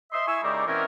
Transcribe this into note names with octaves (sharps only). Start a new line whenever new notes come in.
D#5 E5 C6
E4 G#5 C#6 E6
C#3 G#3 D#4 G4 A#4 D5
B2 E3 C4 C#4 A#4